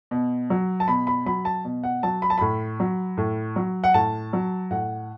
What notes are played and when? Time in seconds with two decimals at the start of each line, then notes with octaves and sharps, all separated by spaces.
0.11 B2
0.50 F#3
0.80 A5
0.88 B2 B5
1.07 B5
1.26 F#3 B5
1.45 A5
1.65 B2
1.83 F#5
2.03 F#3 A5
2.22 B5
2.30 A5
2.38 A2 B5
2.80 F#3
3.17 A2
3.56 F#3
3.84 F#5
3.94 A2 A5
4.33 F#3
4.71 A2 F#5